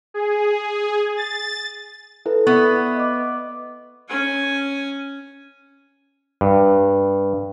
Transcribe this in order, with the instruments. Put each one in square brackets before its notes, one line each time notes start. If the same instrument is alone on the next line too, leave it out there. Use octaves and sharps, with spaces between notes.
[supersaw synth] G#4
A6
[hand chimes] E4 A4 B4
[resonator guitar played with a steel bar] B3 [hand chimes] D5 E5 C#6
[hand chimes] D#5 D6
[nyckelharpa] C#4 G#5
[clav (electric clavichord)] G2